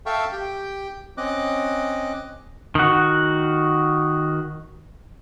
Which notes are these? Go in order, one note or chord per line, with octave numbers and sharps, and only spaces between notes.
A4 E5 F5 G5 C#6
G4 G5
C4 C#4 D#5 D6 F#6
D#3 F#4